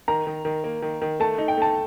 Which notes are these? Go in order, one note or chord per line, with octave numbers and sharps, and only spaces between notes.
D#3 A#5
D#3
D#3
A#3
D#3
D#3
A3 A5
D#4
G5
A3 A5